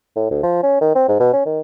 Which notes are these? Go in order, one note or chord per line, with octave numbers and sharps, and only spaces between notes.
A2
D2
F3
C#4
D#3
C4
G#2
B2
C#4
D#3